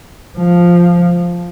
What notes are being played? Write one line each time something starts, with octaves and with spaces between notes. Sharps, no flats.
F3